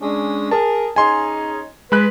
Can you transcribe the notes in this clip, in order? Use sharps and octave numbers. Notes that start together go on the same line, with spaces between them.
G#3 C#4 D4
G#4 A#4 A5
C#4 D#4 G#4 G#5 C6
G#3 B4 B5 F#6